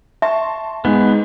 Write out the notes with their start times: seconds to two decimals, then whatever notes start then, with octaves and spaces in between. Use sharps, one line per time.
0.22 E5 A5 C6 C#6
0.85 G#2 G#3 B3